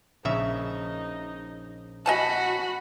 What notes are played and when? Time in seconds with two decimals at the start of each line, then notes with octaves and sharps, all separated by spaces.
0.25 A#1 C#3 D#4 E5
2.06 F#4 D#5 F#5 G#5 A5 B5